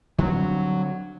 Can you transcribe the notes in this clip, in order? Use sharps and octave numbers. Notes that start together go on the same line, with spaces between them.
D3 F#3 G3 C4